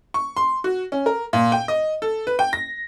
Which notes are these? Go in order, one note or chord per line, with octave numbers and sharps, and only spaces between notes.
C#6
C6
F#4
C#4
A#4
A#2
G5
D#5
A4
B4
G5
A#6